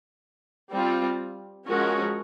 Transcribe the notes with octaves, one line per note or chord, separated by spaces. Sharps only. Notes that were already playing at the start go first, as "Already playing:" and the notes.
G3 C4 F4
F3 G#3 C#4 F#4 A#4